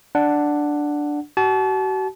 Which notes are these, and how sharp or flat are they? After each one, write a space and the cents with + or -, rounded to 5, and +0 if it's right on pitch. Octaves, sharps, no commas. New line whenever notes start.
D4 +0 F#5 +0
F#4 +40 A5 -35